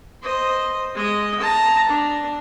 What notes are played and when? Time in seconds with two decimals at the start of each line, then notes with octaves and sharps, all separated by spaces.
0.22 C5 D#5
0.95 G#3 D#5
1.40 A5 A#5
1.89 D4